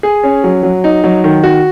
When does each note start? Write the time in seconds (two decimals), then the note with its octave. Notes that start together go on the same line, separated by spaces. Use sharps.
0.03 G#4
0.23 C#4
0.44 F#3
0.63 F#3
0.84 D#4
1.04 F#3
1.24 D#3
1.43 F#4